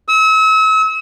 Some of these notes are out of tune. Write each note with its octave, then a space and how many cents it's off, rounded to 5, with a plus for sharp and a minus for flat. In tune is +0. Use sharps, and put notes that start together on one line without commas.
E6 -40